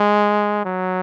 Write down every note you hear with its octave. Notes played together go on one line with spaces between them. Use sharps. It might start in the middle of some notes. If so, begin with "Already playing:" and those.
Already playing: G#3
F#3